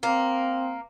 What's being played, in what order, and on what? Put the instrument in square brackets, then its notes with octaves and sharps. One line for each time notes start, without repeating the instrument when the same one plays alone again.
[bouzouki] A#3 [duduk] C4